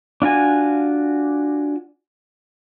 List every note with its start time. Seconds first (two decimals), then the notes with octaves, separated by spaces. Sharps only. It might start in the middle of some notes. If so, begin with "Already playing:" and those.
0.22 D4 F4 F#4 G#5